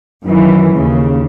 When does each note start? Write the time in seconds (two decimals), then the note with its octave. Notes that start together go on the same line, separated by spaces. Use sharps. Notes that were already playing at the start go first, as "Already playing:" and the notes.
0.25 F#2 D#3 E3
0.75 D#2 C#3